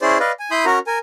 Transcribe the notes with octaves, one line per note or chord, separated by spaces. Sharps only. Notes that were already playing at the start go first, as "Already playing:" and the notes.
C#4 E4 G#4 C5 D5
B4 D5 D#5 F5
G#5
E4 B5 C6 D#6 G6
C#4 F#4 A#4 A#5
A#4 G#5